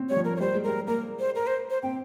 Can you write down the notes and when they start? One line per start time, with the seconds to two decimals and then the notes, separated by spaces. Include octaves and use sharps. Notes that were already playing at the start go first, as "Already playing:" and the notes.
Already playing: C4 C#4
0.09 G3 C#5
0.17 F3
0.25 A#4
0.36 C#5
0.40 G3 C5
0.54 G#3
0.64 G3 A#4
0.87 A#3 A#4
1.19 C5
1.35 A#4
1.47 C5
1.70 C5
1.83 C4 G5